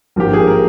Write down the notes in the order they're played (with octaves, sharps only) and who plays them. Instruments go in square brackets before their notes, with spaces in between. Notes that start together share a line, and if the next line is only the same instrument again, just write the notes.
[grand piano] G#1 G2 F3 A#3 G4
G#4
A#4